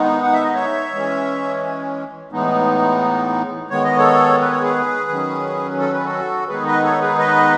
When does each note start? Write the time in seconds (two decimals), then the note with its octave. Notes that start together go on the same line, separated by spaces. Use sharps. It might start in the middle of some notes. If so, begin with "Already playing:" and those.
Already playing: D#3 G#3 B3 D#4
0.23 F#5
0.33 E5
0.44 D#5
0.54 C#5 E5
0.93 E3 G#3 C#4
2.32 A2 E3 G#3 B3 D#4
3.70 D#3 G#3 B3 C#5
3.84 D#5
3.97 A4 C#5
4.41 B4
4.51 C#5
4.62 G#4 B4
5.09 D#3 F#3 C#4
5.79 A4
5.92 B4
6.04 F#4 A4
6.48 D#3 G#3 B3 D#4 G#4 B4
6.67 B4 D#5
6.83 A4 C#5
7.01 G#4 B4
7.18 B4 D#5